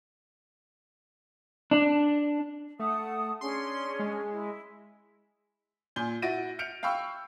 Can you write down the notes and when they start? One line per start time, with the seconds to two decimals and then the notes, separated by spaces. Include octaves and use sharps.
1.71 D4
2.79 A3 F#5 A5 D#6
3.41 C#4 D4 G#4 C6
3.99 G#3
4.32 E4
5.96 A#2 G#5 G6 G7
6.22 E4 F#4 A6 A#6 D7 D#7
6.59 F6 G6 C#7 D7 F7
6.83 F5 G5 B5 C#6 E6